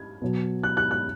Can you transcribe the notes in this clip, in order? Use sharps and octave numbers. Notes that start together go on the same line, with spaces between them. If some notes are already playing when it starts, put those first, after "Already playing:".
Already playing: G#6
B2 F#3
F#6
F#6
F#6